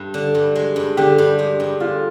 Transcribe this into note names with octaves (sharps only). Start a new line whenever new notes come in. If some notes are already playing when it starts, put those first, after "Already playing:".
Already playing: G2
D3
G2
G#3
G2
D3 G4
G2
G#3
G2
D3 F4